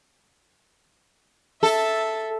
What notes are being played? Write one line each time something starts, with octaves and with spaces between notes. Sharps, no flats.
A4 E5 A5